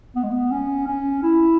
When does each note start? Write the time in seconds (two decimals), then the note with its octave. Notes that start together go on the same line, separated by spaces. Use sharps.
0.16 B3
0.23 G#3
0.31 B3
0.52 C#4
0.87 C#4
1.23 E4